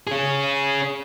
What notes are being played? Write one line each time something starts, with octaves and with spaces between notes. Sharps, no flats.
C#4 G#4